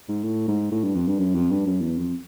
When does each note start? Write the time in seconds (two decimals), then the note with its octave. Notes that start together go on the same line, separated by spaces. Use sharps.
0.08 G#2
0.24 A2
0.48 G#2
0.71 A2
0.84 G2
0.95 F2
1.07 G2
1.19 F#2
1.35 F2
1.51 G2
1.66 F#2
1.81 E2
1.98 F2